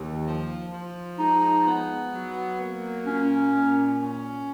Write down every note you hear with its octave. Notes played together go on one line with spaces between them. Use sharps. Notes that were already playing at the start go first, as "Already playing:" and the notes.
Already playing: D#2
F3
F3
G#3 D#4
B3
F#3
A#3
A#2 C#4
A#2
C#4